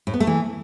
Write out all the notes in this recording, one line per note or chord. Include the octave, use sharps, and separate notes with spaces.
A2
B3
A3
E3